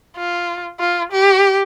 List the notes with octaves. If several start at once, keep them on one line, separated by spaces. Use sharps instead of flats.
F4
F4
G4